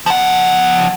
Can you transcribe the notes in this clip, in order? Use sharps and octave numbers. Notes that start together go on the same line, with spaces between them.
F3 F#5